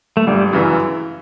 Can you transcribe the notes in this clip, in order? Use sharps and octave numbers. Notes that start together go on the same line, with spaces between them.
A3
G1 G3
F#2 C#3 E3